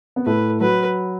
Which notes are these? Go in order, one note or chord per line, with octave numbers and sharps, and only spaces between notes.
B3
A2 A3 B4
F#3 B4